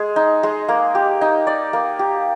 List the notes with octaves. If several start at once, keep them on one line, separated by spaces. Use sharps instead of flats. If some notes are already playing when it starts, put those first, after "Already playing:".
Already playing: G#3 G#4
D#4
G#3
A#3
G4
D#4
D5
A#3
G4